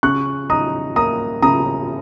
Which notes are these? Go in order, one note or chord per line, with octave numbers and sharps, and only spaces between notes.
C#3 C#6 F#6
D#4 A#5 D#6
A#3 A#5 D#6
C#3 A#5 D#6